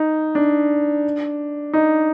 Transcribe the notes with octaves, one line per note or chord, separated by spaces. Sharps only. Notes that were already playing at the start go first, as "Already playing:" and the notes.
Already playing: D#4
D4
D#4